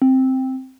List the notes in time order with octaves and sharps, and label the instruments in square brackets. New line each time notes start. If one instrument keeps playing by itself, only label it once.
[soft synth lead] C4